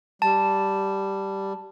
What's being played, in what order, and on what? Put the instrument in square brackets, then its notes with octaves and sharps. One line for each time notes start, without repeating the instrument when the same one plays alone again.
[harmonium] G3 [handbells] A5